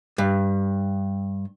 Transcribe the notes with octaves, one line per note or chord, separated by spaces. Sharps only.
G2